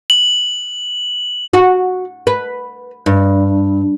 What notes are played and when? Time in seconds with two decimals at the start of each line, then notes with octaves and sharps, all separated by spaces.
0.10 F#7
1.53 F#4
2.27 B4
3.06 G2